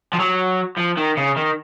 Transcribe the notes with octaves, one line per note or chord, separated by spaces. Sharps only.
F3
F#3
F3
D#3
C#3
D#3